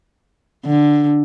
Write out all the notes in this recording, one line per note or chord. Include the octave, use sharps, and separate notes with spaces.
D3